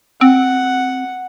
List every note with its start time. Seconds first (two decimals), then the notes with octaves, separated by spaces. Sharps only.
0.21 C4 F#5